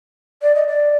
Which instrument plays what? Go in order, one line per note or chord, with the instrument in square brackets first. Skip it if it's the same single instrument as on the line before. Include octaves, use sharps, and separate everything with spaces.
[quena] D5
D#5
D5